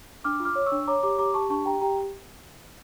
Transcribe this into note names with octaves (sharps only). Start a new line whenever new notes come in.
D4 D6 F6
F4
D6 F6
C#5
C#6 E6
D4
C#5 A#5 D6
G4 A#5 D6
G4 A#5 D6
G4 A5 C#6
D4 A5 C#6
G4 G5 A#5
G4 G5 A#5